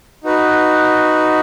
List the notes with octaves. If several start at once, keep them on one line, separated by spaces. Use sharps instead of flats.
D#4 F#4 B4